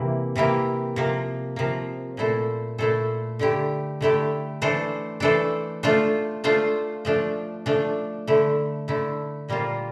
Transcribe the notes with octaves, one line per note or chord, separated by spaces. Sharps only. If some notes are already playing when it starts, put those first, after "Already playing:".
Already playing: C3 E3 A#3 E4 G4
C3 E3 A#3 E4 G4
C3 F3 A#3
C3 F3 A#3
A#2 A3 E4 A4 C5
A#2 A3 E4 A4 C5
D3 A3 E4 G4
D3 A3 E4 G4
E3 A3 D4 A4 C5
E3 A3 D4 A4 C5
A3 D4 F4 C5
A3 D4 F4 C5
F3 A3 D4
F3 A3 D4
D3 A3 E4
D3 A3 E4
A#2 G3 A#3 F4 C5